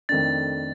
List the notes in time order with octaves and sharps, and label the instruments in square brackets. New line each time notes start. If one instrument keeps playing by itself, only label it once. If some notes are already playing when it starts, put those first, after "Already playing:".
[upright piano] F2 D#3 A3 D4 [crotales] A6